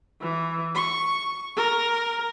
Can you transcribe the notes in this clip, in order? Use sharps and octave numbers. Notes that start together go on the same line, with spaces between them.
E3
C#6
A#4